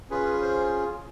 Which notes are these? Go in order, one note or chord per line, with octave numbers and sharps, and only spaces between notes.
C#4 F4 G#4 B4
C5